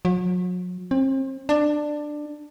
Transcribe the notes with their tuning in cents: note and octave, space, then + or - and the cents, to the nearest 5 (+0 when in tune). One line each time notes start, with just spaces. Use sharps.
F#3 -40
C4 +35
D4 +15